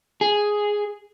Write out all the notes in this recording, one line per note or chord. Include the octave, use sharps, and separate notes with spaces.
G#4